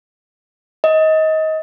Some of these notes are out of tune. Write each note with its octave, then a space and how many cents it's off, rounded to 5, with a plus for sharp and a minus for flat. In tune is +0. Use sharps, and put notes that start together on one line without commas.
D#5 +25